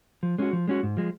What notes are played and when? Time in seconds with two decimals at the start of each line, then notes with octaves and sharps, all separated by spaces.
0.23 F3
0.38 G#3 C#4 F#4
0.53 F3
0.68 G#3 C#4 F#4
0.83 G#2
0.97 F3 G#3